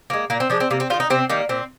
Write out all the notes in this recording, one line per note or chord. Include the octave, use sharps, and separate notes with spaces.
F3 G#3 A#3
A#2 A#3
C4
F3 G#3 D4
C4
C3 A#3
C4
G3 F4
D#3
D#4
C3 C4
D#3 G3 A#3
A#2 C4